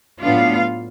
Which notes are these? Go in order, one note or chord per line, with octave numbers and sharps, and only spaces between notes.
A2 F#3 B3 D4 F4 F5